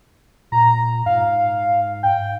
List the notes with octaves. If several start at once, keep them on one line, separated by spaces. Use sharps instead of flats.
A#2 A#5
G#2 F5
G5